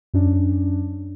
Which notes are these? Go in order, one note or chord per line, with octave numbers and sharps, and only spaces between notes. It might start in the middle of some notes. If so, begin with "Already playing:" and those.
F#2 C#4 D4